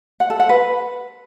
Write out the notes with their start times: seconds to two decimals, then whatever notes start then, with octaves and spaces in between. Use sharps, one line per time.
0.20 F#5
0.30 A4
0.40 F#5
0.49 B4